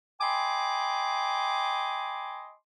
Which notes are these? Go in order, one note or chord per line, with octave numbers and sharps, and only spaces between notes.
D#5 G5 G#5 B5 C6 D6